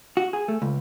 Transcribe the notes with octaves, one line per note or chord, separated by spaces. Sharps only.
F#4
G#4
A3
C#2